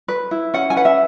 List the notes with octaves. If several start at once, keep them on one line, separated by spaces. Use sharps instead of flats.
B4
E4
C#4 F#5
G#5
B4 F#5
E5